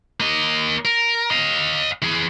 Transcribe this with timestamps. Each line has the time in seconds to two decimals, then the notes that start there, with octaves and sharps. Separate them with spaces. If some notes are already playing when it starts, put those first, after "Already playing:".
0.20 A#3 D#5
0.85 A#4
1.31 D#5 F5
2.02 E3 G#4